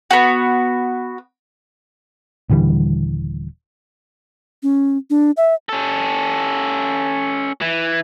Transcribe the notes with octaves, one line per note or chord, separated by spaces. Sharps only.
B3 F#4
D#1 D3 E3 G3
C#4
D4
E5
C#4 A4
E3